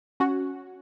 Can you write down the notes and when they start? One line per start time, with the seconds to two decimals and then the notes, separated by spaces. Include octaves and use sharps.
0.20 C#4 F#4